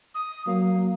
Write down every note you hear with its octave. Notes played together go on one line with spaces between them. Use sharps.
D#6
F#3 A#3 F5